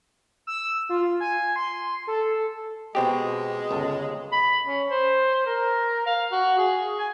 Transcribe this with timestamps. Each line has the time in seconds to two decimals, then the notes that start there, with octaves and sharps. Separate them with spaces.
0.47 E6
0.89 F4
1.20 G#5
1.56 C6
2.07 A4
2.95 B2 G#3 C4 G4
3.71 G1 C#2 A5
4.32 B5
4.66 C#4
4.90 C5
5.46 A#4
6.06 F5
6.32 F#4
6.59 G#4
6.99 G#5